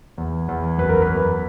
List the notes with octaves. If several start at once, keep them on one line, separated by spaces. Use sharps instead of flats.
E2
E2
F#2 B4
A#4
B4
F#2